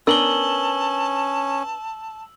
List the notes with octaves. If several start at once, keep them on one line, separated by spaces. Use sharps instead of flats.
B3 C#4 D4 A#4 A5 E6 F#7 G7